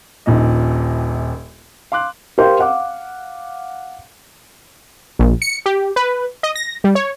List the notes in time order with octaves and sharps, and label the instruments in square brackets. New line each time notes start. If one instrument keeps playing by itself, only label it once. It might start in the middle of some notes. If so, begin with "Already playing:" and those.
[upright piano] D#1 A#1 A#2 D#4 D#5
F5 C6 D6 F#6
[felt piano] G4 A#4 C5 F5 G5
F5 F#5 D6
[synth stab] A#1
C#7
G4
B4
D#5
A#6
G3
C#5